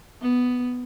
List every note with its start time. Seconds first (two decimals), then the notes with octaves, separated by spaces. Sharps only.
0.21 B3